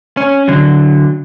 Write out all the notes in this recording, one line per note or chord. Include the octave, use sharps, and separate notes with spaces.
C#4
D3 F#3